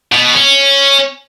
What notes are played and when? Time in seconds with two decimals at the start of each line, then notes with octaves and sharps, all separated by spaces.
0.12 B2
0.34 C#4